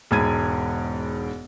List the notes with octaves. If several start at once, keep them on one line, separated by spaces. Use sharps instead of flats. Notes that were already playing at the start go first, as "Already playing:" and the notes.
E1 G#2 B5 G#6 D#7